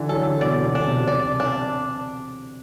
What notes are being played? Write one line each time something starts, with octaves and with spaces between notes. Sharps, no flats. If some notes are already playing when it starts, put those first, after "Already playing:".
Already playing: D3 E3
F#3 A4
D3
B2 D5
B2
B2 D4
C3
B2
C3 D5
D4